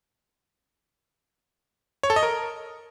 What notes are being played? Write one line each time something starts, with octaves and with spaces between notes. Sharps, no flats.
C#5
A4
D#5
A#4